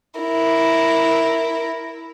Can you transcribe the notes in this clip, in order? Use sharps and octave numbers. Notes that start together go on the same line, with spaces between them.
E4 A#4